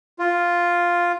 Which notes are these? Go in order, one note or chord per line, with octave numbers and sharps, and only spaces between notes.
F4